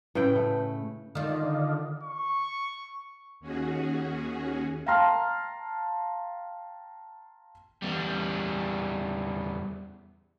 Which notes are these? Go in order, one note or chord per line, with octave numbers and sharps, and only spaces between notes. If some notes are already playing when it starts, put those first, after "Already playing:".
A2 C#3 B4 G5
A3
D3 D#3 F4 D5 D#5 F5
C#6
D#2 C#4 F#4 G#4
F5 G5 A5 A#5 C6 F6
E2 G3